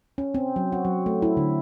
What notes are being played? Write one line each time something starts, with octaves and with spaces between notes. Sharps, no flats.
C#4
C4
F#3
F#4
F#3
A3
E4
D3